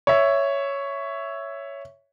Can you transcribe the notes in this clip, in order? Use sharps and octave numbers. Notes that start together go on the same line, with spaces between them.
C#5 E5